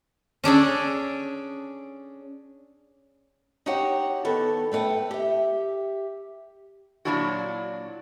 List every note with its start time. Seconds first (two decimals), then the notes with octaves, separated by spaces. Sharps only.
0.44 C#4 D4 G#4 A4
3.66 D#4 F#4 G4 C#5 F#5 G5
4.25 D#3 B3 A4
4.72 A3 B4 C#5 F#5 G5
5.11 G4 E5
7.05 A#2 F#3 G#3 D4 E4 F#4